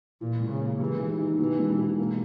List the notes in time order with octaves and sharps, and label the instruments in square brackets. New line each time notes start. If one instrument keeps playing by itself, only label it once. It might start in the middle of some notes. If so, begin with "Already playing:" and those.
[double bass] A#2 [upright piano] E3
[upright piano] C#2
[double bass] C#3
[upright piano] A#3
[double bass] E3 [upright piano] G#3
[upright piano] D#2
D#4
[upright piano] B2 [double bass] E3
[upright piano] E1
E1
A#3